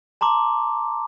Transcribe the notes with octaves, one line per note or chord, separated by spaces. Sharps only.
A5 A#5 C6 D6